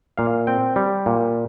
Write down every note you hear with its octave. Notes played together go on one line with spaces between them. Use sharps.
A#2 F5
C4 G5
G3
A#2